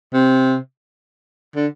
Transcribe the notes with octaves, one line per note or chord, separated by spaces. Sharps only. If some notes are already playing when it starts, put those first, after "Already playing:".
C3
D3